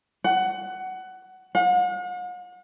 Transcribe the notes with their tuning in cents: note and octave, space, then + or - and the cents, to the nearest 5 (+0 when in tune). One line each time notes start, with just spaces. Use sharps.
F#5 +15
F#5 -45